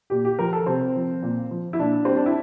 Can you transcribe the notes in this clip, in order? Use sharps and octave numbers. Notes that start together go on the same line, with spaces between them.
A#2 G4
G4
F3 A#4
A4
C3 C4
F3
A#2
F3
E4
A#2 D4
G3 C4
D4
E4